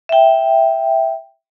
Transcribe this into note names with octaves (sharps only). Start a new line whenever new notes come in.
E5 G5